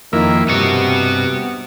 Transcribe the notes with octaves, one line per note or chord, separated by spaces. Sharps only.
F2 D#3 A#3 E4
G2 C3 B3 F#4